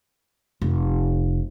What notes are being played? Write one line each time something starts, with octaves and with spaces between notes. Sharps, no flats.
F1